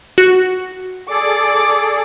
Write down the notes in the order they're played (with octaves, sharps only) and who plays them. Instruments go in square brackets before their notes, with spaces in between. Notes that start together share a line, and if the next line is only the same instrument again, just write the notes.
[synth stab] F#4
[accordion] G#4 A4 D5 [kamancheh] D6